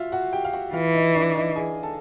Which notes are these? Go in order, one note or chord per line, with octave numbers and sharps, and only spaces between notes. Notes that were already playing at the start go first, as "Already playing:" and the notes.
Already playing: F4 F#4 E5 F5
F#4 F#5
G4 G5
F5
F#4 F#5
E3 F4 F5
D#4 D#5
D4 D5
D#4 D#5
G#4 G#5
A4 A5